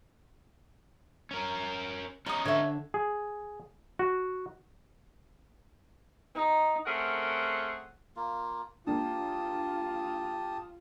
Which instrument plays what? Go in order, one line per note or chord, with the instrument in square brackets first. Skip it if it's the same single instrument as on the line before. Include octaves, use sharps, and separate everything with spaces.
[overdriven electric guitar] C#4 A#4
[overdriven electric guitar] C#4 D#4 [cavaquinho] A#5 D#6
[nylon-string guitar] D3 [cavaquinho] C#5 E5
[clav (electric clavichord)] G#4
F#4
[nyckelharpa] D#4
[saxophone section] A3 C4 C#4 G#4 A#4 F#5
[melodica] A#3 F4
[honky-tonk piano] A#3 D4 [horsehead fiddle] F4 [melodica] G4 A5 D#6